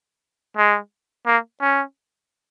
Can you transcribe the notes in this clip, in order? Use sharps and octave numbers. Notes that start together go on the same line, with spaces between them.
G#3
A#3
C#4